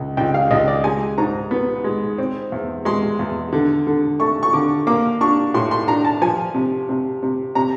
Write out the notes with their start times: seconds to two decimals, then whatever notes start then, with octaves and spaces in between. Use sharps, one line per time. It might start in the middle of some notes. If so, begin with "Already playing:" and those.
Already playing: C#2
0.17 C#2 G5
0.34 F5
0.51 C#2 D#5
0.68 D5
0.84 G#3 G#5
1.18 G#2 A#5
1.51 B3
1.84 G#3
2.18 C4
2.52 E2
2.85 G#3 C6
3.19 E2
3.52 D3
3.87 D3
4.20 A3 C#6
4.43 C#6
4.53 D3 D6
4.87 A#3 D6
5.21 D4 C#6
5.54 A2 C6
5.71 C6
5.87 D4 A#5
6.05 A5
6.22 F3 G#5
6.54 C3
6.89 C3
7.23 C3
7.55 C3 A#5